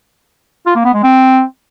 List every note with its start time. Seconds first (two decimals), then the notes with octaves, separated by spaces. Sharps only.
0.66 F4
0.76 A#3
0.85 B3
0.94 G#3
1.03 C4